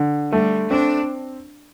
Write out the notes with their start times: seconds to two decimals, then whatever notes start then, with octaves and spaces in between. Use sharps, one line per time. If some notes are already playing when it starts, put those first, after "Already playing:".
Already playing: D3
0.32 G3 A3
0.71 C4 D4